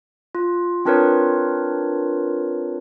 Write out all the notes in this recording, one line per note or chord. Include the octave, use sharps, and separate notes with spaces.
F4
C4 D4 F4 A#4 B4 C#5